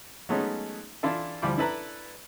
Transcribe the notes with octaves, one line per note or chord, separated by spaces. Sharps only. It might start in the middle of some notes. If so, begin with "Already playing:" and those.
F#3 G#3 A3 B3 C#4 D#4
E3 D4 E4 F4 A4
D2 E3 F3 G3 B5 D6
D4 E4 A4 B4 A#5